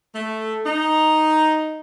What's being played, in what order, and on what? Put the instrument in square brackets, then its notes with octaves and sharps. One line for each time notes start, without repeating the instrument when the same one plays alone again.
[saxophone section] A3
D#4